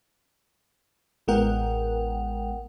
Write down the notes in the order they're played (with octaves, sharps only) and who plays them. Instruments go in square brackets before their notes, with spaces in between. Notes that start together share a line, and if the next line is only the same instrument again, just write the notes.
[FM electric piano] A1 G#3 B3 A#4 F#5 G5